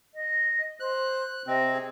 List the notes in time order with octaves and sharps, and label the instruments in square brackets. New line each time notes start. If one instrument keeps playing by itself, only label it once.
[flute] D#5
[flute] C5 [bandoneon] F#6
[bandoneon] C3 C4 [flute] D#5
[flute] G#4